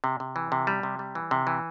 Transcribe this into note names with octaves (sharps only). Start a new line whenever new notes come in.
C3
C3
E3
C3
G3
C3
G3
E3
C3
E3